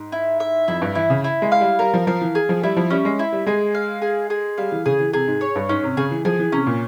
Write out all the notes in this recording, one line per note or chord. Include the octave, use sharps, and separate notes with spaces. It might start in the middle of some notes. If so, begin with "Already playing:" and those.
Already playing: G#2
E4
E5
F2 E4
G2
E3 E4
C#3
E4
G#3
F5
G3
G3 A#4
F3
F3 F5
E3
G#4
F3
G3 E4
F3
G3 C#4
G#3
E4
G3
G#3 G#4
F5
G#4
G#4
G3 F5
E3
C#3 G#4
E3
C3 G#4
G#2
C#5
G2
G#2 C#4
C3
C#3 G#4
E3
F3 G#4
E3
C3 C#4
A#2